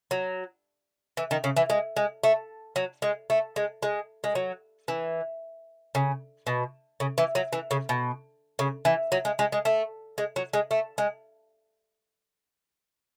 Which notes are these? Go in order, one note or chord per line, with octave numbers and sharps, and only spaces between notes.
F#3
E3
D#3
C#3
E3
G#3
G#3
A3
F#3
G#3
A3
G#3
G#3
G#3
F#3
E3
C#3
B2
C#3
E3
F#3
E3
C#3
B2
C#3
E3
F#3
G#3
G#3
G#3
A3
G#3
F#3
G#3
A3
G#3